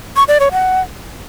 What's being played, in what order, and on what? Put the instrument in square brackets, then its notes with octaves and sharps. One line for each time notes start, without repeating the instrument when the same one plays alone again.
[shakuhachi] C#6
D5
C#5
F#5